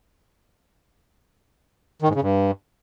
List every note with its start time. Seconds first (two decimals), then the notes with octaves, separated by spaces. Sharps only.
2.02 D#3
2.09 G#2
2.15 C#3
2.22 G2